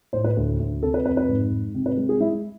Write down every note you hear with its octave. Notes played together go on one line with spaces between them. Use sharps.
A2 C5
B4
D2
D2
C3 A4
B4
F2 B4
B4
G#2
G#2
C3
B4
G#3
G#4
G#3 E4